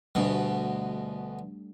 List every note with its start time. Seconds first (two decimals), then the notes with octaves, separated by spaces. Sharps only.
0.15 D2 B2 G3 A3 D4